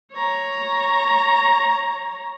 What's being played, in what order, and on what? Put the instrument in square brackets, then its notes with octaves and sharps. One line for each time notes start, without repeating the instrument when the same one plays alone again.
[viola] C#5 A#5